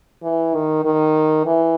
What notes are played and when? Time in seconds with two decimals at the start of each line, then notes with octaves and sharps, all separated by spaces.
0.23 E3
0.54 D#3
0.85 D#3
1.46 E3